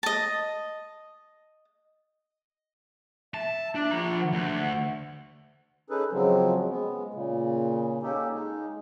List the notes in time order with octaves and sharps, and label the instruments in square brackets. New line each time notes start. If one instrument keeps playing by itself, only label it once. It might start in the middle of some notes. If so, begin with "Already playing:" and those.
[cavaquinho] D#5 A5
[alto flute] E5 [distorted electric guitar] A5
[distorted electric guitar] D4
F3 A#5
[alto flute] F#5
[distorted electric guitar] D2
[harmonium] C#4 D#4 G#4 A4 B4
C#3 F3 F#3 G#3 C4
G#3 B3
A#2 C#3
A#3 C#4 D#4 G4 A4
G#3 D#4